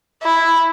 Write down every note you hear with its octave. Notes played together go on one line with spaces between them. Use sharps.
E4